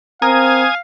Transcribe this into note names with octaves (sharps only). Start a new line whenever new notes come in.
C4 A#4 F5 G#5 D#6 G#6